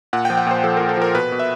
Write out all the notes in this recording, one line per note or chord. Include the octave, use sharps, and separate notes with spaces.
A#2 F#5
G5
F3
F#5
A#2 C5
F3 A4
A#2 A#4
A4
F3 A#4
B2 B4
B2
E5